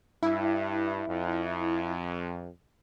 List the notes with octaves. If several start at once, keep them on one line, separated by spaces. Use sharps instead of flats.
G2 E4
F2